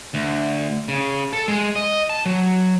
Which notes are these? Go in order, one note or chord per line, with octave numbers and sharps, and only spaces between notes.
D2
C#3
A4
G#3
D#5
A5
F#3